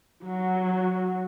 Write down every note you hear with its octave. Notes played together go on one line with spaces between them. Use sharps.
F#3 F#4